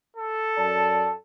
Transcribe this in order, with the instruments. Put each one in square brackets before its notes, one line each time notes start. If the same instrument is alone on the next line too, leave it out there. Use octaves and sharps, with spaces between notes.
[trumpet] A4
[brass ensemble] F#2 D5 A5